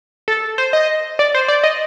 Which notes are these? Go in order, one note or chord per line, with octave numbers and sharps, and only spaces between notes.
A4
C5
D#5
D5
C5
D5
D#5